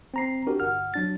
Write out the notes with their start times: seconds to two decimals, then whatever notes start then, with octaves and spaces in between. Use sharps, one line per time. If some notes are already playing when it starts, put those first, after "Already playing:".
0.14 C4 A#5 C7
0.47 D4 F#4 G4 A#4
0.60 G1 F#5 F6
0.94 F#3 D4 A6